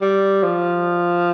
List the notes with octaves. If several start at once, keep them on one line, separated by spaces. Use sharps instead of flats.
G3
F3